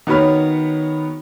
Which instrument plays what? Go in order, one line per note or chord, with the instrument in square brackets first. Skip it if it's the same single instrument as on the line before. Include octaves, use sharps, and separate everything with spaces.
[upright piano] D#3 B3 F#4 C#5 B5 F6